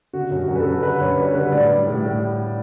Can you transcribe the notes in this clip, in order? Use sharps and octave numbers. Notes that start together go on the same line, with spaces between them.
D3 F#4
F#2
G4
F#2
B4
A4
F#2
D3 B4
F#2 C#5
G3 B4
D3 B4
A2 D5
G3
A2
A2